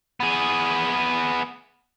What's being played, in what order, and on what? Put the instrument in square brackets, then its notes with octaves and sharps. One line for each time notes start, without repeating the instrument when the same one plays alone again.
[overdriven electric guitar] B3 G#4